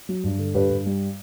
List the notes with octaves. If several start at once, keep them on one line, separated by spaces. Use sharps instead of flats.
F#3
G2
D3
G2 G4 B4
G2
G3